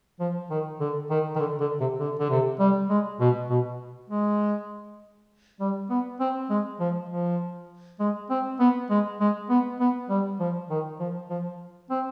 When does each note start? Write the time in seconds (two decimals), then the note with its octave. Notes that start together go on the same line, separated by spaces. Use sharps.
0.20 F3
0.50 D#3
0.80 D3
1.10 D#3
1.35 D#3
1.40 D3
1.60 D3
1.80 C3
1.99 D3
2.20 D3
2.30 C3
2.60 G3
2.90 G#3
3.20 B2
3.50 B2
4.10 G#3
5.60 G3
5.90 B3
6.20 C4
6.50 G#3
6.80 F3
7.10 F3
8.00 G#3
8.30 C4
8.60 B3
8.90 G#3
9.20 G#3
9.50 B3
9.80 B3
10.09 G3
10.40 F3
10.70 D#3
10.99 F3
11.29 F3
11.90 C4